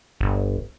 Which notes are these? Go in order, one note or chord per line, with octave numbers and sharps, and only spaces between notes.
G1